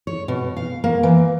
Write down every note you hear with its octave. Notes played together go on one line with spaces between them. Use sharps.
C#5
B2
F5
A#3
E3